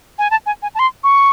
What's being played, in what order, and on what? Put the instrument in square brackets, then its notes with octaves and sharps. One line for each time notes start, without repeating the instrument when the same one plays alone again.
[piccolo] G#5
A5
G#5
G#5
A5
C6
C#6